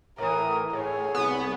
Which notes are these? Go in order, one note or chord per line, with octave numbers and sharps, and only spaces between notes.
A2 E3 A#4 D#6
A2 G#4 C#5
C2 B3